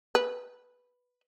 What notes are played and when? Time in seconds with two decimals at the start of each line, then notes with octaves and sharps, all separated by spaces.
0.15 B4